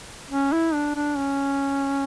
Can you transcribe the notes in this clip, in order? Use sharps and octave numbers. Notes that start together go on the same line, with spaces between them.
C#4
E4
D4
D4
C#4